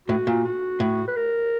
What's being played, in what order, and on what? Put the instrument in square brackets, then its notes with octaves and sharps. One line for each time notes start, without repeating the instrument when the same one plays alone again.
[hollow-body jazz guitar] A2 [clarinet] F#4
[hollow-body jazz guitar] A#2
[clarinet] F#4
[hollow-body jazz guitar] A2
[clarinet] B4
A#4